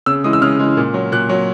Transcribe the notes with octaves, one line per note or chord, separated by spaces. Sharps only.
C#3 E6
E3 G#3 D#6
E6
C#3 F6
E3 G#3
A#2
F#3
A#2 F#6
F#3